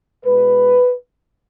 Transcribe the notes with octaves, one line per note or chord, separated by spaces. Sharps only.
B2 G#3 B4